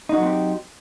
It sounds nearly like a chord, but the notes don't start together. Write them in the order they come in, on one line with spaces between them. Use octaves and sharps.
D#4 F#4 F#3 C4 G4